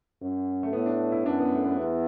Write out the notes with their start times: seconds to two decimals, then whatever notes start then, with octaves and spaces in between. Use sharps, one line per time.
0.22 F#2
0.63 A3
0.73 A2 B3
0.86 D4
1.12 E4
1.25 F#2 D4
1.39 B3
1.52 A3
1.64 B3
1.77 E2